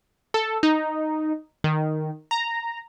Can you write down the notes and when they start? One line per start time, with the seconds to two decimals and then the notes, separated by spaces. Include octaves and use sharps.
0.34 A4
0.63 D#4
1.64 D#3
2.31 A#5